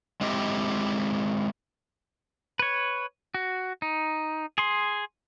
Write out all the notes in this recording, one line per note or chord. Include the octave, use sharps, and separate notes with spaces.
G#3 C4 E4 G4 D#5
B4 C#5
F#4
D#4
G#4 C6